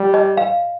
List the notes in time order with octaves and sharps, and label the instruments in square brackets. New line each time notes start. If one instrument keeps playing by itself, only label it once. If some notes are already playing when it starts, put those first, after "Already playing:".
Already playing: [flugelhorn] G3
[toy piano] D#5
F5